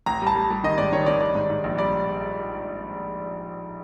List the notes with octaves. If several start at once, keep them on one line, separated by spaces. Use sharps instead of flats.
A1 A#5
G3
A5
G3
G3
D#3 D#5
G#2 D5
D#3 C#5
D#3 D5
G3 D5
G#2
G#2
A#1
G3 D5